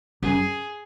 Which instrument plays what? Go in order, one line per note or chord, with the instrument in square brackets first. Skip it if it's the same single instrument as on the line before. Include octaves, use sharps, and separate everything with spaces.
[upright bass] F#2 [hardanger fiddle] G#4